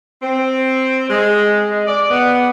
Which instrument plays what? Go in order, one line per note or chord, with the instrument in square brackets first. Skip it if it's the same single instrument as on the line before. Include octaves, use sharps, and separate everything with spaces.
[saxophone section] C4
G#3
G#3
D5
B3